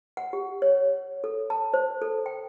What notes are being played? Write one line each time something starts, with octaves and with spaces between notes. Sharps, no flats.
F#5
G4
C#5
A4
A5
C5
A4
G5